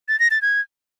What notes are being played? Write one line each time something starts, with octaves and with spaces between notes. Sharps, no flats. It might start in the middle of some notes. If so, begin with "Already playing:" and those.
A6
A#6
A6
G#6